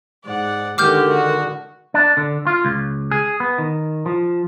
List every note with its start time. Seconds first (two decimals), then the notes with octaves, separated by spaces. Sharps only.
0.25 G#2 D5 F#5
0.78 D3 D#3 G#3 F#4 G4 D6 F6 G6
1.08 F#4
1.94 D4
2.17 D3
2.47 F4
2.65 C#2
3.11 G#4
3.40 B3
3.58 D#3
4.06 F3